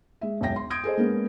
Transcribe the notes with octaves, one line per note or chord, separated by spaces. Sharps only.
G#3 E5
E1 B1 E5 G5 A#6
C6
C6 D#6 G6 G#6 A#6 D7
G#4 A4 C5 D#5
G#3 A#3 B3 C#4